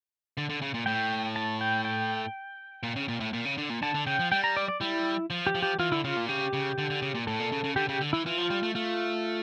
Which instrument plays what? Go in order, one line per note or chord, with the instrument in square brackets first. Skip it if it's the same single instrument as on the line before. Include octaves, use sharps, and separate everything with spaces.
[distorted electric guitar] D3
D3
C#3
A#2
[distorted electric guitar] A2 [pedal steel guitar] G5
[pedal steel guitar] A5
G5
G5
[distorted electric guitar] A#2
C#3
A#2
A2
A#2
C#3
D3
A#2
[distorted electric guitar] D3 [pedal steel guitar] A5
[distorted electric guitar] D3
[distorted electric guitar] C#3 [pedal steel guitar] G5
[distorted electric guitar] F3
[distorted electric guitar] G3 [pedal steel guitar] G5
[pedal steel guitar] A#5
D5
D5
[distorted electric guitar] G3 [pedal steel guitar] E4
[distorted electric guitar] F3
[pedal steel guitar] G4
[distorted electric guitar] F3
[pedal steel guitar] G4
[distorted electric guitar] E3 [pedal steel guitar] F4
[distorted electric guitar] D3 [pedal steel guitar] E4
[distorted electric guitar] C#3 [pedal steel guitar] F4
[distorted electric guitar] A#2
[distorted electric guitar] C#3 [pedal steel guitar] G4
[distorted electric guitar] C#3
D3
D3
C#3
A#2
[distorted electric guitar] A2 [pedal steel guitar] A4
[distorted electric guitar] A#2
C#3
C#3
[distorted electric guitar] D3 [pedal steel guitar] G4
[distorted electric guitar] C#3 [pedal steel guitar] G4
[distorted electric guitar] D3
[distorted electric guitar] E3 [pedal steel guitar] E4
[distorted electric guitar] E3 [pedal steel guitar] F4
[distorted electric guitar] F3
G3
A3
[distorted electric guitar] A3 [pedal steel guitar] F4